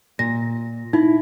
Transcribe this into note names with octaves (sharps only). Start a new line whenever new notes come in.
A#2 A#6
D#4 E4